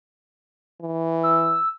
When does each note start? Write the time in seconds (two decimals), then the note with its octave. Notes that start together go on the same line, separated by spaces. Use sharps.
0.81 E3
1.23 E6